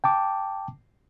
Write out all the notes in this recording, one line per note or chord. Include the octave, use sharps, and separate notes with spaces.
G5 A5 D6